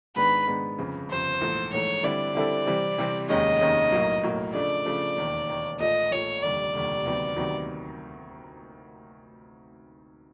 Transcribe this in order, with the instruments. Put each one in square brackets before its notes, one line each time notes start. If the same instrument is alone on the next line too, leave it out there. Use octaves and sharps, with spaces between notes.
[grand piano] G#2 D#3 G#3 B3 D4 [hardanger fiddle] B4
[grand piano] G#2 D#3 G#3 B3 D4
G1 F2 C#3
[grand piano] G1 F2 C#3 [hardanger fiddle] C5
[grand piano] A#1 G#2 E3 A3
[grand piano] A#1 G#2 E3 A3 [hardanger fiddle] C#5
[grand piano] D3 G3 C4 E4 A4 [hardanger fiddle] D5
[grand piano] D3 G3 C4 E4 A4
C3 E3 G3 C4
C3 E3 G3 C4
[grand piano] F1 D#2 D#3 G#3 C#4 [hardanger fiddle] D#5
[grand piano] F1 D#2 D#3 G#3 C#4
B1 A2 F#3 A#3
B1 A2 F#3 A#3
[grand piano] C#3 F3 A3 D4 [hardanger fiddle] D5
[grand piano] C#3 F3 A3 D4
E1 D#2 D#3
E1 D#2 D#3
[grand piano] A#1 A#2 F3 A3 [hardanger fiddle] D#5
[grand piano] A#1 A#2 F3 A3 [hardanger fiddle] C#5
[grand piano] F1 D#2 D3 G3 [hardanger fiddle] D5
[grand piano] F1 D#2 D3 G3
D2 C3 D#3 F#3 B3
D2 C3 D#3 F#3 B3